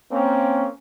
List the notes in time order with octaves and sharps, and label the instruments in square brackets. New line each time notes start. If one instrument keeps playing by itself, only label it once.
[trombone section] A#3 C4 C#4